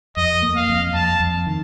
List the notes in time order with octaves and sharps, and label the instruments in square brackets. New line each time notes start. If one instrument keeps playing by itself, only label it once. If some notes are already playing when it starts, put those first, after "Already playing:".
[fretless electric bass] F2 [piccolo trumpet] D#5
[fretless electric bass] A#3
[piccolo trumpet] F5
[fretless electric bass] F2
[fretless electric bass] F2 [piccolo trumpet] A5
[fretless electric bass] F2
D#3